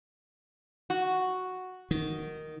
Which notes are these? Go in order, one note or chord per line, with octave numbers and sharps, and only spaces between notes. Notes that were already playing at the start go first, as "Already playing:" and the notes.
F#4
D#3